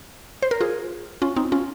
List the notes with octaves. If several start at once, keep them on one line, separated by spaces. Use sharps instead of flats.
C5
A#4
F4 G#4
C#4 F4
C4 D#4
C#4 F4